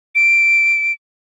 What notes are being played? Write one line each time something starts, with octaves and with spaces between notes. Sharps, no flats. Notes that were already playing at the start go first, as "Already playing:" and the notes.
D7